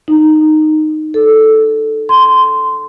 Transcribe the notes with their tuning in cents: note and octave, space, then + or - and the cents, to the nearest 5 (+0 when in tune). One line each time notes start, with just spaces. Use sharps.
D#4 -10
A4 -5
C6 -10